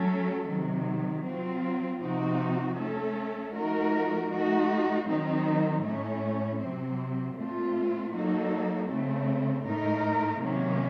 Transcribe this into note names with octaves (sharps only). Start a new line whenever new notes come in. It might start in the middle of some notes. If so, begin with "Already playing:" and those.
Already playing: F#3 A3 C#4 A4
C3 D#3 F#3
F#3 C4 F4
C3 F3 C4 D#4 F#4
A3 C#4 A4
F3 A3 D#4 F#4 A#4
A3 D#4 F#4
D#3 F#3 C4 D#4
A2 A3 C#4
C3 F#3 C4
A#2 A3 C4 F4
F#3 A#3 D#4 F#4 A4
C#3 A3 C4
A2 A3 D#4 A#4
C3 D#3 F#3 A#3 C#4